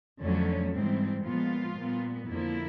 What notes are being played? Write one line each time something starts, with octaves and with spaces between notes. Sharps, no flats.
F2 D3 F#3 A3 C#4
G#2 E3 G3 C4
A#2 F3 G#3 B3 F4
A#2 G3 B3
F2 D3 F3 A#3 E4